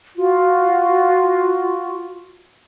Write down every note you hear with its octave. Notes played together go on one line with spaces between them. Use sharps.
F4 F#4